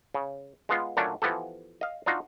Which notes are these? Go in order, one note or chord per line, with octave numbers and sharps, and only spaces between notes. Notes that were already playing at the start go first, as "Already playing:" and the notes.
C#3
G#3 B3 F4
A#2 F#3 A3 C#4 D4
E3 F3 B3 G4 A4
D#5 F5
D4 D#4 F4 F#4 D#5